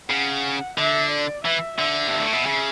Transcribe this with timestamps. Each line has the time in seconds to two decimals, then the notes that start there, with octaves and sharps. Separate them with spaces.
0.10 C#3 F#5
0.77 D3 E5
1.11 D5
1.44 E3 E5
1.78 D3 E5
2.08 G2
2.20 A2
2.33 B2
2.46 C#3